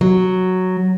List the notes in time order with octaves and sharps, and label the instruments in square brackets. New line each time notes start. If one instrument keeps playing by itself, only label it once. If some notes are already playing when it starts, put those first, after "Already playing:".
[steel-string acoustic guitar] F#3